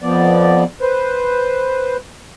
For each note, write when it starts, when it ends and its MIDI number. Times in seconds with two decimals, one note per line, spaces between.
0.02 0.64 41
0.02 0.64 53
0.02 0.64 59
0.02 0.64 74
0.81 1.97 71
0.81 1.97 72